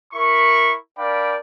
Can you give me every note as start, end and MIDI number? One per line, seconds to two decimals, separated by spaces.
0.13 0.74 64
0.13 0.74 70
0.13 0.74 83
0.13 0.74 85
0.98 1.37 62
0.98 1.37 70
0.98 1.37 74
0.98 1.37 77
0.98 1.37 79
0.98 1.37 83